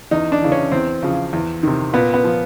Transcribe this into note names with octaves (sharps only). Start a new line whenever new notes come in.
E2 D#4
D4
C#3 E3
C#4
E2 C4
C#3 F3
E2
C3 D#3
A#2 B3
B3
F3